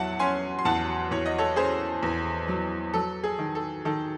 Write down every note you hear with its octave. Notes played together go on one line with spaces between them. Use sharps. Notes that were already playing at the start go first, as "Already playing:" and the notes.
Already playing: E2 F#3 E5 F#5 A5
C#4 G#5 C6
C6
E2 F#5 A5
E2 C#5
D#5
A4 C#5
C#4 G#4 C5
E2
F#3
F#3 A4
G#4
D#3
A4
D#3 A4